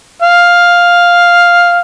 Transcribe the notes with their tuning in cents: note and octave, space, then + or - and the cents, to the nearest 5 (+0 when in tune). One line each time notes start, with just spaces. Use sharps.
F5 +5